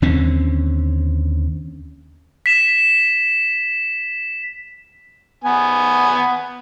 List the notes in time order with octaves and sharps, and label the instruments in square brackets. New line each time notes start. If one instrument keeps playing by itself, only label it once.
[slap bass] D#2 D3 C4 C#4
[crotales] B6 E7
[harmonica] B3 G#5